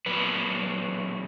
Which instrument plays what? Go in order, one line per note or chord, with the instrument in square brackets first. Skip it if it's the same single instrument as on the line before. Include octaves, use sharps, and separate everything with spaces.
[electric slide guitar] A#2 F#3 B4